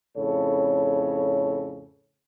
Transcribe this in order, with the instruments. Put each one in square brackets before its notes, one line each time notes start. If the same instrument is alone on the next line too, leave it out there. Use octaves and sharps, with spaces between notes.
[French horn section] F2 A2 C#3 A4 C#5